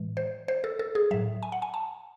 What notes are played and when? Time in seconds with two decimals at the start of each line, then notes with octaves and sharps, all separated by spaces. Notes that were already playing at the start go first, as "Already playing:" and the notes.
Already playing: A2 E3 G#3
0.17 C5
0.48 C5
0.64 A4
0.79 A4
0.95 G#4
1.11 A2 F#3 E5
1.43 G#5
1.52 F#5
1.62 G#5
1.74 A5